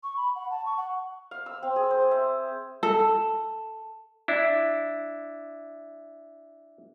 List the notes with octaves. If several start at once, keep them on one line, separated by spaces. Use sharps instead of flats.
C#6
B5
F#5
A5
C#6
F#5
F5
E6
C4
G#4
C5
E5
A4
D4 E4